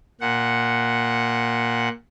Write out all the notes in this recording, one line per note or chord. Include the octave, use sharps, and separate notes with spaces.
A#2 F#5